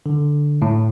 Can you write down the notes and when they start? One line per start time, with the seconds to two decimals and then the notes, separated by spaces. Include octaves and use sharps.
0.06 D3
0.62 A2